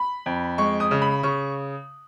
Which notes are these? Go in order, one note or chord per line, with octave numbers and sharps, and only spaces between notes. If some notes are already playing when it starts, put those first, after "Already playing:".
Already playing: B5
F2
G#3 C#6
D#6
C#3
B5
C#3 C#6